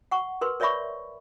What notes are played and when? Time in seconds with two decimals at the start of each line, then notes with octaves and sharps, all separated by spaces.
0.11 F#5 C#6
0.41 A#4 B4 C6
0.60 A#4 C#5 D5 E5 B5 C#6